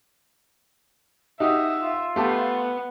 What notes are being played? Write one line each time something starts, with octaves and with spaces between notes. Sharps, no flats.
D#4 F#4 G4 E5 D#6
F4
A3 B3 G4 A5